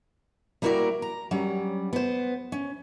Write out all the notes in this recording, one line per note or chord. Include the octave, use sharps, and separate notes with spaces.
G3 A#3 E4 F#4 A#4 D5
A#5
F#3 G3 C#4
B3 C5
C#4